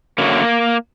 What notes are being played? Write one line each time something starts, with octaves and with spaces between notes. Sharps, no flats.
F#2 D3 F#3 A#3